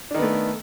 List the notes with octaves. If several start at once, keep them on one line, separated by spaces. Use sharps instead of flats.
D#3 A3 B3 D4